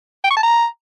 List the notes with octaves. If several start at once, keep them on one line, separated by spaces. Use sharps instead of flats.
G5
C#6
A5
A#5